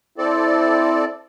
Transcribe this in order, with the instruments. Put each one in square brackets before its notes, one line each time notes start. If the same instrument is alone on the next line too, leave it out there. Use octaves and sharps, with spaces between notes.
[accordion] C4 A4 D5 [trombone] E4